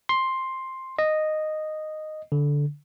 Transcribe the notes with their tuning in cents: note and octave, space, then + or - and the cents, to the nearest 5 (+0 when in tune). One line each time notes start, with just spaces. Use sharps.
C6 +10
D#5 -10
D3 -15